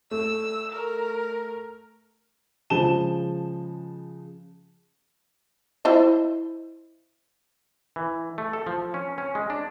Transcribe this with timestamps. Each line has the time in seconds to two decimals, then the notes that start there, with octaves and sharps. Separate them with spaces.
0.11 A3 E6
0.72 A#4
2.70 C#3 F3 G#3 A5 E7 G7
5.85 E4 C5 D#5
7.96 E3
8.38 A3
8.53 A4
8.67 F3
8.94 C#4
9.18 C#4
9.35 G#3
9.50 D4